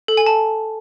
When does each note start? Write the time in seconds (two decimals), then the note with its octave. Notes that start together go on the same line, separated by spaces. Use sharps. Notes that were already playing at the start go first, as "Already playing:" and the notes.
0.08 A4
0.17 G#5
0.26 A5